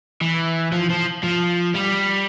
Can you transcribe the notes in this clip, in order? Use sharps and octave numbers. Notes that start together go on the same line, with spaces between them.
E3
F3
F3
F3
G3